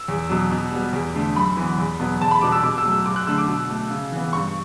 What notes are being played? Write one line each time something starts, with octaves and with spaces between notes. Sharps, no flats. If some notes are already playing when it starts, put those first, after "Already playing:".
Already playing: E6
E2
B2 F#3
B2
G3 B3
E2
D3 A3
F#2 B5
E3 B3
E2
B2 F#3 B3
E2 A5
B5
B2 G3 B3 D6
E6
B2 D6
E6
F#3 A3
E6
F#2 D6
F#6
D3 A3 E6
D6
B2
A3
C#3
E3 B3
G2 C#6